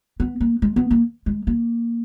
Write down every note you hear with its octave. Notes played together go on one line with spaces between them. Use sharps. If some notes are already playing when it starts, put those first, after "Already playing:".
B3
A#3
G#3
B3
A#3
G#3
A#3